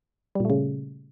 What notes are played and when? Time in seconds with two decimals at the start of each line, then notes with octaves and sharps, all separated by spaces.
0.35 G3
0.40 A#2
0.45 A3
0.50 C#3